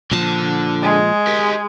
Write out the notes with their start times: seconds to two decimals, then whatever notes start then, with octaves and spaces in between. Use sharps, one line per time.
0.11 A#2 D3 F3 A5
0.83 G#3
1.27 G4 A#4